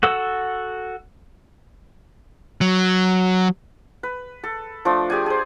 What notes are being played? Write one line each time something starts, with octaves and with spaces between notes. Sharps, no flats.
F#4 A4 F#5 E6
F#3
B4
A4
F3 A3 D4
G4 G#4 D5 G#5
G#4 C5